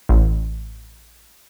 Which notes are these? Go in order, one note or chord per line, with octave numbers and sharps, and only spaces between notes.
A1